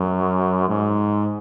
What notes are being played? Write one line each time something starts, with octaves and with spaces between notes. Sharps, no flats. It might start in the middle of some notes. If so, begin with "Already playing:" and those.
Already playing: F#2
G#2